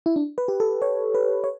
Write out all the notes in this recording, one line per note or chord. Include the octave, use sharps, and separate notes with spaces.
E4
D4
B4
G4
A4
C#5
B4
C#5